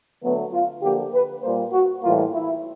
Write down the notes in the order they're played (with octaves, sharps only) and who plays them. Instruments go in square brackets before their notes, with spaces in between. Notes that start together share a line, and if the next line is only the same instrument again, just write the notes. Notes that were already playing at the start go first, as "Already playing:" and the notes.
[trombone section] D3 F#3 A3 B3
F4
D3 F3 A#3 G4
B4
A#2 G3 A#3 C5
F#4
A2 E3 G3 A#3 F4
E4